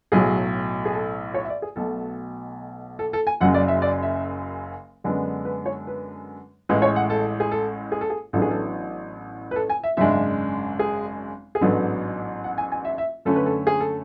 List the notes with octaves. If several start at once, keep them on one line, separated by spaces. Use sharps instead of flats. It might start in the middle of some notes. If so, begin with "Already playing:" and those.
B1 A2 F#3 G#4
G#4
A4
C#5
E5
D5
G#4
B1 B2 A3 A4
A4
A4
G#5
F#1 F#2 C#3 F#3 F#5
D5
E5
D5
E5
F#2 D3 G#3 B3 D4
B4
C#5
B4
A1 A2 G#3 B4
C#5
F#5
A4
G#4
A4
G#4
A4
G#4
A1 A2 F#3 B3 D4 A4
G#4
A4
B4
A4
G#5
E5
G#1 F#2 C#3 G#3 D4 E5
G#4
G#4
A1 G#2 F#3 B3 D4 A4
F#5
G#5
G#5
E5
E5
F#2 D3 A3 C#4 A4
B4
A4
G#4
A4